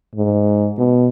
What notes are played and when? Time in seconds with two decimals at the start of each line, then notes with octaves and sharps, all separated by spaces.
0.16 G#2
0.78 B2